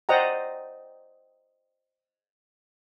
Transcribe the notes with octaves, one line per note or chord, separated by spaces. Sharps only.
C5 D5 D#5 F#5 G5 A#5